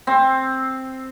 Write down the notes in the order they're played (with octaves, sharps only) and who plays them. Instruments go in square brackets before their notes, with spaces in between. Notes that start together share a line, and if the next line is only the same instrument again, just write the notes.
[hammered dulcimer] C4